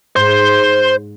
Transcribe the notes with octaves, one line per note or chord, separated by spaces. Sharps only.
G#2 C5